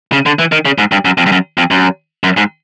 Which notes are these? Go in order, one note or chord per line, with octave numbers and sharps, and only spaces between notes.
C#3
D3
E3
D#3
C#3
G#2
G2
F#2
F2
G2
F#2
F2
F#2
F#2
G#2